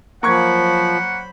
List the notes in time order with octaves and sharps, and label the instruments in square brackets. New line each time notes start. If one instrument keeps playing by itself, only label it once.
[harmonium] F3 [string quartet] F#3 C5 B5 [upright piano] A#3 C#6 G#6 [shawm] F#5